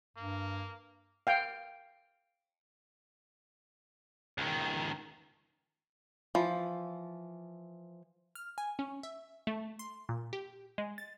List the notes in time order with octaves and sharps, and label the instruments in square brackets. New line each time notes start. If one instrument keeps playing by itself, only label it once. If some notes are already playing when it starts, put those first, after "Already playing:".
[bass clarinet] G2 [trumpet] A#3
[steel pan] F5 G5
[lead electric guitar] C#2 D#3
[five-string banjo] E3 F3
[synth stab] F6
G#5
C#4
E5
A3
C6
A#2
G4
G#3
A6